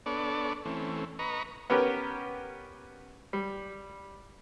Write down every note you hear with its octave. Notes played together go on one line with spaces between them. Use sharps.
B3 D4 A4 C#5 D5
E3 A3 C4 C#4
B4 D#5 A#5 C#6
B3 C#4 G4 A#4 B4
G3